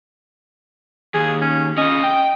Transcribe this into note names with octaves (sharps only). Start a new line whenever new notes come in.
D#2 G#4
C#4
C#4 F4 D#5
G5